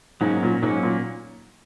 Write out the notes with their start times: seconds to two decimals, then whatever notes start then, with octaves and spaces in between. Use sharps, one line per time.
0.21 G#2 F#3 A#3 C#4
0.43 A#2
0.62 G#2 F#3 A#3 C#4
0.83 A#2